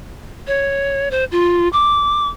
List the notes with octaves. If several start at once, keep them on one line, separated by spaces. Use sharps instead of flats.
C#5
C5
F4
D6